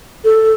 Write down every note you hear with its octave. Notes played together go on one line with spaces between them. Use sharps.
A4